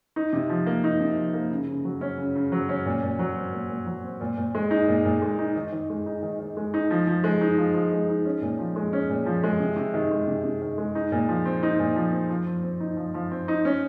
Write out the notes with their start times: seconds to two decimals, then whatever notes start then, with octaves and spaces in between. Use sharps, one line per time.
0.16 D#4
0.33 C3
0.50 F3
0.66 A#3
0.84 D#4
1.00 C3
1.17 F3
1.34 A#3
1.51 C#3
1.68 C#3
1.85 F#3
2.01 C#4
2.18 C#3
2.36 C#3
2.52 F#3
2.69 C#4
2.86 A#2
3.03 A#2
3.19 F#3
3.36 C4
3.53 A#2
3.70 A#2
3.87 F#3
4.04 C4
4.21 A#2
4.38 A#2
4.55 G#3
4.71 D#4
4.88 A#2
5.05 A#2
5.22 G#3
5.39 D#4
5.56 D#3
5.72 D#3
5.90 G#3
6.06 D#4
6.23 D#3
6.39 D#3
6.57 G#3
6.74 D#4
6.90 F3
7.07 F3
7.24 G#3
7.41 D#4
7.58 F3
7.74 F3
7.92 G#3
8.09 D#4
8.25 C#4
8.42 A#2
8.59 F3
8.76 G#3
8.93 C#4
9.10 A#2
9.26 F3
9.43 G#3
9.60 C3
9.76 C3
9.94 D#3
10.11 G#3
10.27 C3
10.44 C3
10.62 D#3
10.78 G#3
10.95 D#4
11.12 A#2
11.29 F3
11.45 C4
11.63 D#4
11.79 A#2
11.96 F3
12.12 C4
12.30 F3
12.47 F3
12.63 C4
12.80 D#4
12.97 F3
13.14 F3
13.31 C4
13.48 D#4
13.65 C#4